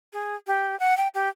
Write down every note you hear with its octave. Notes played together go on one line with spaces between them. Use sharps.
G#4
G4
F#5
G5
G4